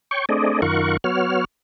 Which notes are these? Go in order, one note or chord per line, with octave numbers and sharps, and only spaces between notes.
C#5 G5 C#6
A3 C4 D4 G#4 D5 D#5
F#2 D#3 F4 A#4 F#5 C#6
F#3 B3 F#4 C#5 F6